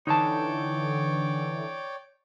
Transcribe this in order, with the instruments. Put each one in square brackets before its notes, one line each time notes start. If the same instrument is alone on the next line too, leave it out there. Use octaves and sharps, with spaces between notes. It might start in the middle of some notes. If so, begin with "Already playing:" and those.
[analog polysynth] D3 E3 [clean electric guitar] D#4 A5 [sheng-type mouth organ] C#5 D5 G5